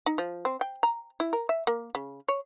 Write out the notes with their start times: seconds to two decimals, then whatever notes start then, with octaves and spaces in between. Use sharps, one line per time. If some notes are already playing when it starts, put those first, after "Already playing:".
0.06 D#4
0.18 F3
0.45 C4
0.61 G5
0.83 A#5
1.20 E4
1.33 A#4
1.49 E5
1.67 A#3
1.95 C#3
2.28 C#5